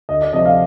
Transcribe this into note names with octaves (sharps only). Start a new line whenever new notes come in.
D2 D#5
D5
C3 F3 A3 D#5
F5